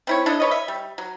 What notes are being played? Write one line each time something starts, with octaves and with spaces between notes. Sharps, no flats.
C4 E4 C#5
D4 E4 A4 D#5
B4 C#5 D#5
E5
G3
F#3